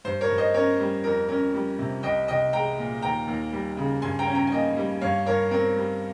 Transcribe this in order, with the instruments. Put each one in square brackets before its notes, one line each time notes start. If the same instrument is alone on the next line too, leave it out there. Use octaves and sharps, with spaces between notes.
[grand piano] G2 C5
A#4 C#5
G2
C5 D#5
C#4 A#4 C#5
G3
F2 A#4
C#4 A#4
G3
C3
C2 D#5 G5
C2 D#5 G5
G#3 G5 A#5
A#2
D#2 G5 A#5
D#2
G3
C#3
G2 G#5 C6
G5 A#5
C#4
G5 A#5
G#5
A#3 D#5 G5
G3
G2 C#5 F5
G2 A#4 C#5
C4 A#4 C#5
G3